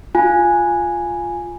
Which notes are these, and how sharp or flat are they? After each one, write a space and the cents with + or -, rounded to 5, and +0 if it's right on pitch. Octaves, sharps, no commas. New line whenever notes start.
F4 +0 G#5 +0